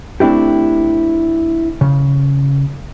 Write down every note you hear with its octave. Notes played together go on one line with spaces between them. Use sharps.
A3 C4 D4 E4 G4
C#3